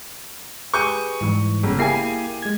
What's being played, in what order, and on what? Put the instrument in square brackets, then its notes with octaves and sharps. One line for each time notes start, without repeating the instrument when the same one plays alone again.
[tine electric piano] G4 G#4 B4 [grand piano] C#6 G6 D#7
[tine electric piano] G#2 E3 G3
[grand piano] G1 C#3
[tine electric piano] A#3 E4 C7 [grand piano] G4 G#4 G#5
[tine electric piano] G#3 G#6